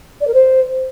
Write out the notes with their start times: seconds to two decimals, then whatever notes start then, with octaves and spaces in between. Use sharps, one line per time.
0.21 D5
0.27 A#4
0.34 C5